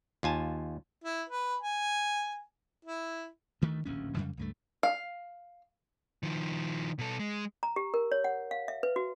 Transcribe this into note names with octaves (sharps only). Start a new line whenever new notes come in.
D#2 F4 G#5 A5
E4
B4
G#5
E4
D2 D#3 A3
D1 A#1 D#2 C#4
F2 C#3 G3
C#2 G2 A3
F5
D#3 F3
B2 A4
G#3
A#5
G4
A#4
C#5
F#5
F5
E5
B4
F#4